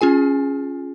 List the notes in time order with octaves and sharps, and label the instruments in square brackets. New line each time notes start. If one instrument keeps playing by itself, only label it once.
[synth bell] C#4 F4 G#4 G#5